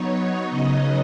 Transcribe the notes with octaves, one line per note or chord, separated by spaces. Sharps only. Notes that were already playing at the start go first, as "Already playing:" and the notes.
Already playing: F#3 B3 D#4 C#5
C#3 F#3 B3 D#4 D#5